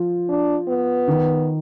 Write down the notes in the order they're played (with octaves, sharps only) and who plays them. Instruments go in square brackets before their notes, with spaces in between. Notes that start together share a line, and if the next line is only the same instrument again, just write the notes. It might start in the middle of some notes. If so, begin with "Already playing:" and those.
Already playing: [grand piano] F3
[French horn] D4
B3
[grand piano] D#3